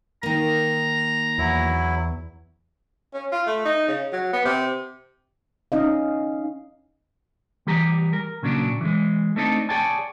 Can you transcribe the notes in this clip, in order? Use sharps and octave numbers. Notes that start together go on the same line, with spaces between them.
D#3 A#3 A#5
E2 F#3 E4
C#4
F4
A3
D#4
C#3
F#3
B3
C3
C#4 D#4 D#5 F5
E3 G3 G4 G#4 A#5
A#4
A#2 C#3 F#3 C#4 D4
E3 G#3
A3 C4 D4 D#4 G4 A4
G#4 C#5 D5 G5 A5